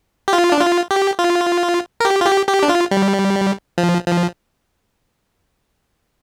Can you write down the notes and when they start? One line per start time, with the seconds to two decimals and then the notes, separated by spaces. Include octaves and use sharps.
0.28 G4
0.33 F4
0.52 D4
0.61 F4
0.91 G4
1.19 F4
2.00 A#4
2.05 G4
2.21 F4
2.26 G4
2.48 G4
2.63 D4
2.69 F4
2.91 G3
3.78 F3
4.06 F3